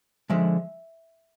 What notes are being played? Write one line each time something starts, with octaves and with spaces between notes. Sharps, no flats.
D3 F3 G#3 E5